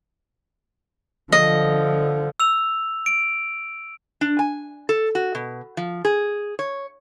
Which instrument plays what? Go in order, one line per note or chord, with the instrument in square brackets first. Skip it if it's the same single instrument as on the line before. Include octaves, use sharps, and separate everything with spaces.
[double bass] D3 F3 [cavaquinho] D#5
[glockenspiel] E6 F7
D7
[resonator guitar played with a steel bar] D4
G#5
A4
F#4
B2
F3
G#4
C#5